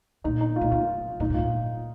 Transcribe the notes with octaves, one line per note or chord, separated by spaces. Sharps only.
A#2 D#4
D#4
F4
A#2 D#4
C3 F4
A#2 D#4
G#2
A#2 F4